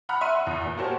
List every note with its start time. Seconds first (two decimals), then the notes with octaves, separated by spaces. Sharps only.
0.09 F#5 A#5 B5 F6 F#6
0.21 E5 C6 D#7
0.35 F#5
0.47 E2
0.65 A#2
0.77 F#4 G4 A#4 C5 C#5 A5